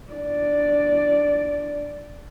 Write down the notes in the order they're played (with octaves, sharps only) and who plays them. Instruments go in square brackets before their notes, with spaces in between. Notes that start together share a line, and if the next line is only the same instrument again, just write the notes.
[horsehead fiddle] D4 D5